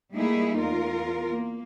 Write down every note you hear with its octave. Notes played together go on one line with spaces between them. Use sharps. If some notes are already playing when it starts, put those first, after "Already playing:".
G3 A3 A#3 D#4 E4 G#4
E2 F4 A#4
A#3